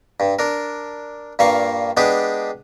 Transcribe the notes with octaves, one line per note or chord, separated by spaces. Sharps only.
G2
D4 A#4
G2 A#2 A#3 F5 C#6
G#3 B3 D4 G4 G#4